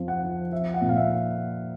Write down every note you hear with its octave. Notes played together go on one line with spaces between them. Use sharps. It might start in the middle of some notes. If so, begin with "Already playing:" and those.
Already playing: F2 F3
F#5
F3
F3 E5
F#5
A#2
F5
E5